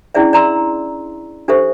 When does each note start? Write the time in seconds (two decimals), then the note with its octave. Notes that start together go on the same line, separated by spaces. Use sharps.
0.15 C#4 D4 E4 G#4 D5 E5
0.33 D5 A#5 C6 E6
1.48 D4 G4 A4 C5 E5 C#6